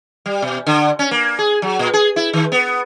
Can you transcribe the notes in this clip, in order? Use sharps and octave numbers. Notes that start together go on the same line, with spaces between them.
G3
B2
D3
C#4
A#3
G#4
F#3
A#2
G#4
E4
D#3
B3